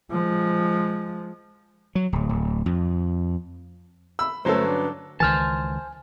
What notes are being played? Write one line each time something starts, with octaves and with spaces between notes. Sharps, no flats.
F3 G#3
F#3
D1
D1
F2
B5 E6
G1 F#3 A3 C#4 A4 B4 C5
D4
C#2 D#3 E3 C5 G#5 A5 F6